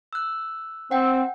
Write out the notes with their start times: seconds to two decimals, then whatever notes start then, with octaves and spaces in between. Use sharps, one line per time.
0.13 E6 F#6
0.91 C4 F#5 G5